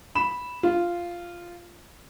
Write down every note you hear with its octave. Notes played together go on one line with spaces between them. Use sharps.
B5 E7
F4